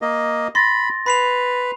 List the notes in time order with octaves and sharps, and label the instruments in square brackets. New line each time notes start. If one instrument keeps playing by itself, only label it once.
[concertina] A#3 D#5
[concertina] B5 [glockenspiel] C6 [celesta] A6 A#6
[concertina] B4 [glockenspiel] B5 C7 F7